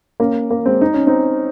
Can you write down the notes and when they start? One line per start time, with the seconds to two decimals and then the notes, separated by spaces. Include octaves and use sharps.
0.20 A#3 C#4
0.50 A#3
0.66 G#3 C4
0.81 D#4
0.94 C#4
1.07 C4 D#4